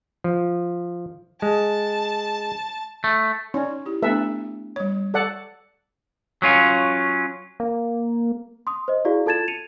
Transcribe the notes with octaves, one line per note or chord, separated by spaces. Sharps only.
F3
G#3 A5
A3
C#4 D#4 D5
E4 G4
A3 B3 D4 A4 B4 E5
G3 C#5
A4 D5 F#5
F#3 C#4 F4
A#3
C6 D#6
C5 D#5
E4 F#4 G#4 D5 F5
F4 A4 A5 G#6 A6 E7
C#7 D#7 F7